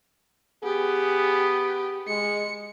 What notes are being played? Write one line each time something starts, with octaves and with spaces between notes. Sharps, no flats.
B3 G4 G#4
G#3 C#7